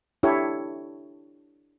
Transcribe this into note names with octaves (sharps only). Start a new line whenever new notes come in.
D4 E4 G4 A4 C#5